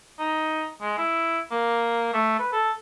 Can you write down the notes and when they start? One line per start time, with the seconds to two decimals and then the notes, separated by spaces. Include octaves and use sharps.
0.19 D#4
0.82 G#3
0.98 E4
1.51 A#3
2.14 A3
2.39 B4
2.53 A4